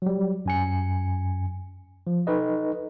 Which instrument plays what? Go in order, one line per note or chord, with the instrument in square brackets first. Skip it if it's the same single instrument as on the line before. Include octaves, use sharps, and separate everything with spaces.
[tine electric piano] F#3 G3
F#2 G#5 C#7
F3
D#4 A4 B4 D#5